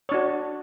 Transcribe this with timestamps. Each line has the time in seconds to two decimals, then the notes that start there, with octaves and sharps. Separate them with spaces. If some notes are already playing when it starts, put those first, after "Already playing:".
0.09 C#5
0.12 D4
0.14 F#4